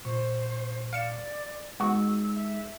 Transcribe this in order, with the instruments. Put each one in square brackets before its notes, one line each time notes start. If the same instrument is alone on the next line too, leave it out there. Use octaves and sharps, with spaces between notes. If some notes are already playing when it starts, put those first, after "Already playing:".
[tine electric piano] A#2 C#6 [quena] C5
[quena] D5 [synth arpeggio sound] F5 C#7 E7
[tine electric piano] G#3 D#4 [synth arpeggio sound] B3 F#4 [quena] E6
[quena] E5